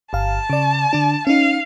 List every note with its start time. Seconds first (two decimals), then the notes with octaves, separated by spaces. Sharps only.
0.13 G1 F5 A5
0.50 C#3 D5
0.93 D3 D4
1.27 C#4 D#4 F5